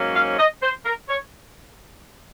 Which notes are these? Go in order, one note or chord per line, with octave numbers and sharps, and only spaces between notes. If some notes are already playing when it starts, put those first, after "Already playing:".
Already playing: G#2 F#3 A#3 C#4
F5
D#5
C5
A#4
C#5